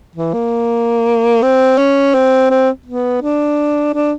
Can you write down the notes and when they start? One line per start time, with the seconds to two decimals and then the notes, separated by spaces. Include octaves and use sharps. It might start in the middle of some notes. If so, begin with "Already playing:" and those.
0.16 E3
0.34 A#3
1.42 C4
1.78 C#4
2.14 C4
2.51 C4
2.86 B3
3.22 D4
3.94 D4